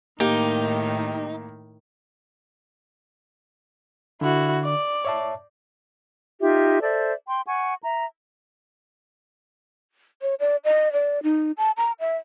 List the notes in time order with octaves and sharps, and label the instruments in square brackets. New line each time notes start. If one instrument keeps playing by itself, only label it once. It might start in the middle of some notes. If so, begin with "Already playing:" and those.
[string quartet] A2 D#3 [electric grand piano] A#3 [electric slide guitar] D#4 [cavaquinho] G4
[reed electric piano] D3 [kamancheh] E4 F#4
[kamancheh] D5
[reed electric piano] C#5 E5 A5
[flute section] D#4 F4 G4 E5
A4 C5 D5 E5
G5 C6
F#5 G#5 C#6
E5 A#5
[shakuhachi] C#5
D5
D#5
D5
D#4
A5
A#5
E5